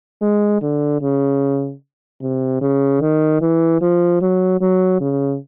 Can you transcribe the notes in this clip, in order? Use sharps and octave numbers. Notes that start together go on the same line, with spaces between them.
G#3
D3
C#3
C3
C#3
D#3
E3
F3
F#3
F#3
C#3